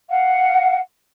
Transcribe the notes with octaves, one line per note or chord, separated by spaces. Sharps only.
F5 F#5